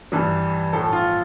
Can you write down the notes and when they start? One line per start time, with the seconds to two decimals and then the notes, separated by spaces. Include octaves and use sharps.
0.12 G2 E3 G3
0.73 A2 F3 A4
0.93 F4